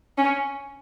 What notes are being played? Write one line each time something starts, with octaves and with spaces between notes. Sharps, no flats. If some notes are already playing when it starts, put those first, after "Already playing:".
C#4